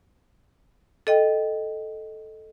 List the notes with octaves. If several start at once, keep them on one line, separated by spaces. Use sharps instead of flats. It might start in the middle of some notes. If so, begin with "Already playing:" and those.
A4 D#5 G5